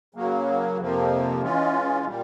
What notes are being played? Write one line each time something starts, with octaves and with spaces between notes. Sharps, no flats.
C#3 F#3 A#3
F2 C3 F3 A#3
E3 G#3 C#4 F4
A#2 G3